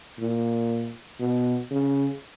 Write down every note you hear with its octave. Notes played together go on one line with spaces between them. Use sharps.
A#2
B2
C#3